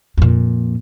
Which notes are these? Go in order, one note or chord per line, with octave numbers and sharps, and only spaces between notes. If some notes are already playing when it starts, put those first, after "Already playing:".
F2 A#2